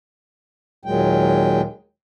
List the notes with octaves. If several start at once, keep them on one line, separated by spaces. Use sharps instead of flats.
D#2 A#2 F#3 G#3 G5